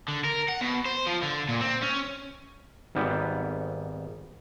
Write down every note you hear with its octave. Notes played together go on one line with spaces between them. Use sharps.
D3
A#4
F#5
B2
C5
F3
D3
A#2
C4
C#4
G#1 G#2 G3 B3